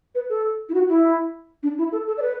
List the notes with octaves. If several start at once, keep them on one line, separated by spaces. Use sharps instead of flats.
B4
A4
E4
F#4
E4
D4
E4
A4
A4
D5
B4